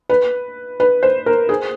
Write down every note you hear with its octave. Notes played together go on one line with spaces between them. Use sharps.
B4
B4
C5
A#4
G#4